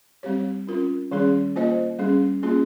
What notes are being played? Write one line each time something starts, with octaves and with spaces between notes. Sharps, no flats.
G3 C4 G4 C#5
C#4 F4 A#4
D#3 G3 C#4 G#4
A#3 F4 C5 D#5
G3 C#4 G#4
A#3 C#4 F4 G#4